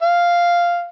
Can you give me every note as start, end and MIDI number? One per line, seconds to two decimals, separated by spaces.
0.03 0.89 77